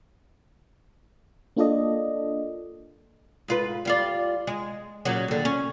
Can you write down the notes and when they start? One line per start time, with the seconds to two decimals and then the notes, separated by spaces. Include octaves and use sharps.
1.57 A#3 D4 F4 A4 D5 D#5
3.48 G#2 F4 B4
3.85 G3 F4 D5
4.47 G#3
5.05 A#2 C#3 F#3
5.28 D#2 D3
5.45 C#4